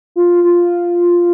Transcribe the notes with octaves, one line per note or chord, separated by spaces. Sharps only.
F4
F4